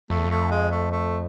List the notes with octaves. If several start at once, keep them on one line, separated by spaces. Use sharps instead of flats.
F2 A3
E2
F2
A3
G#3
A3
A3